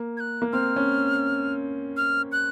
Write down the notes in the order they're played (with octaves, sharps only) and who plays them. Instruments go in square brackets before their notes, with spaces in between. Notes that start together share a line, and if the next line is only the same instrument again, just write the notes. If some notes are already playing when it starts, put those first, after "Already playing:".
Already playing: [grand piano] A#3
[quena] G#6
F#6
[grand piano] A#3
[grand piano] C4 [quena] F6
[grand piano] C#4
[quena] F6
F#6